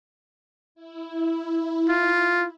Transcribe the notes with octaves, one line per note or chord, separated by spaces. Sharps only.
E4
F4